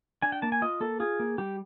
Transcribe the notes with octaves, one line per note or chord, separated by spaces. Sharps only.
D4 G#5
G5
A#3 A5
G#5
F4 D#5
A#3 A4
F4 G#4
A#3
G3 G4